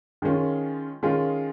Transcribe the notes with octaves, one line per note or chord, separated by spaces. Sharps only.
D#3 G#3 C#4 F4
D#3 G#3 C#4 F4